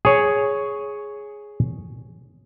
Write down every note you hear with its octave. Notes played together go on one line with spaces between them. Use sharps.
G#4 C#5